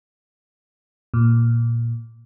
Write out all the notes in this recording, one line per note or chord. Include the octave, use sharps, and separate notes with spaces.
A#2